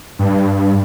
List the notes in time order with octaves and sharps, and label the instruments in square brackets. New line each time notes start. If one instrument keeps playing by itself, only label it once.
[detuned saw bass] G2